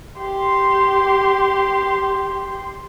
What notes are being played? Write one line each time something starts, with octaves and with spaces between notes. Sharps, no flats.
G4 C6